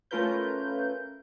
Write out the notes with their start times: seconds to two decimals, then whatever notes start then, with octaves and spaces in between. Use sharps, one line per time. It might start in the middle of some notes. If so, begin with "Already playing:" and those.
0.11 A3 C#4 F4 A#4 B4 G6